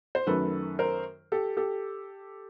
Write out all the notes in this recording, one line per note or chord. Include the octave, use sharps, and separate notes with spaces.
C5
F#2 D#3 F#3 A3 A4 B4
A#4 C5
G4 A4
G4 A4